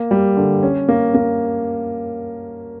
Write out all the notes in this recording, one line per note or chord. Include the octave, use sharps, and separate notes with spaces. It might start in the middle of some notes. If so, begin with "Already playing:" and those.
Already playing: A#3
G3
D3
C#4
A#3
A#3